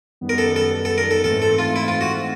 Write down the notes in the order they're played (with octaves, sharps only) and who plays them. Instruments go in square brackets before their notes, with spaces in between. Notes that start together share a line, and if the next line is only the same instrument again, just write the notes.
[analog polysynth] F#2 D#3 G3 B3
[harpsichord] A#4
A4
A4
A4
A#4
A4
[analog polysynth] G#2 E3 A3 C4 [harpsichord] A4
[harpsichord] A4
F4
E4
F4
F#4